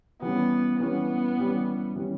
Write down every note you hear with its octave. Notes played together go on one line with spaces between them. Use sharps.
E3 G3 B3 C#4
E3 G3 B3 C#4
E3 G3 C#4
E3 G3 C#4